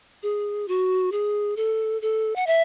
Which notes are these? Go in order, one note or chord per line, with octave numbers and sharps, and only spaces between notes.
G#4
F#4
G#4
A4
A4
F#5
E5